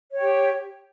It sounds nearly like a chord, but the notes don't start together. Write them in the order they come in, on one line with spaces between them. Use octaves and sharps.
C#5 G5 G4